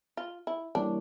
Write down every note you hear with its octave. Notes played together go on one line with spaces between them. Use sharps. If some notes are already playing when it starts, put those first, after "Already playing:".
F4
E4
E3 G3 A#3 C#4 D4